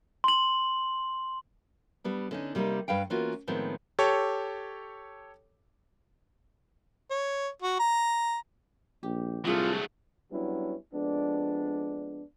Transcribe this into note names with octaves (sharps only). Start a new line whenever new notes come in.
C6 F#7
G3 B3 D4
D3 C#4 D#4
C3 G3 A#3 D4 D#4
G2 B4 F5 G5
E3 A#3 B3 C#4 F4 F#4
A2 D#3 F3 G#3 B3 C4
G4 A4 C#5
C#5
F#4
A#5
A#1 G4
C2 F#3 A3 D4 F4 G#4 A4
F#3 G3 B3 C#4 D4 E4
F2 G#3 B3 D4